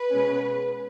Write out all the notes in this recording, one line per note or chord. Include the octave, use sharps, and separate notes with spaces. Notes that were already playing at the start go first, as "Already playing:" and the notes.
Already playing: B4
B2 G#3 C#4